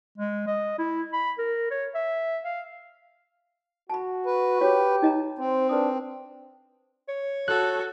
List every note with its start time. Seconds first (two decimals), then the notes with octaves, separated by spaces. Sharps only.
0.18 G#3
0.47 D#5
0.78 E4
1.13 B5
1.39 A#4
1.71 C#5
1.95 E5
2.45 F5
3.90 F#4 A5 B5
4.26 B4
4.61 F#4 G4 C#5
5.02 D#4 D#5 A#5
5.39 C4 C5
5.69 D4 B4 D#6
7.09 C#5
7.48 F#4 A4 F#6